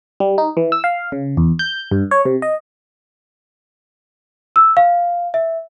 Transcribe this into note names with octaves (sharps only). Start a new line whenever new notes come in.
G3
D#4
E3
E6
F5
C#3
E2
G6
G2
C#5
C3
D#5
E6
F5
E5